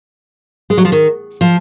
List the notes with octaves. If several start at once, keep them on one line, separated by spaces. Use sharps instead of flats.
G#3
F#3
F3
D#3
F3